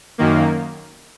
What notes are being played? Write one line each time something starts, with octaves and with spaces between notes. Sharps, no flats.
F#2 D#3 A#3